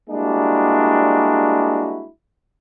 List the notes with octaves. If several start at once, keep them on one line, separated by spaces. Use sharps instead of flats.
G3 G#3 A#3 D4 E4 F#4